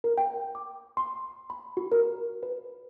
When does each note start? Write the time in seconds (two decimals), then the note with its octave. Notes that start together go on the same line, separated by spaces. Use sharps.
0.04 A#4
0.18 G5
0.55 D6
0.97 C6
1.50 B5
1.77 F#4
1.92 A#4
2.43 B4